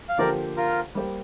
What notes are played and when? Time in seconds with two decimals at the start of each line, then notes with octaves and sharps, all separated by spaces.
0.09 F5
0.18 D3 F3 A#3 G4 A#4 C5 D5
0.57 F4 A#4
0.95 G3 A#3 G4 C5